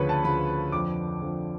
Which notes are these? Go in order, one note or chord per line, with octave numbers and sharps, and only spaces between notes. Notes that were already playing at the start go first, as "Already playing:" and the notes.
Already playing: D2 C#3 F3 B4 C#5
A5
D2 C#3 F3 B5
F2 D3 F3 D6
F2 D3 F3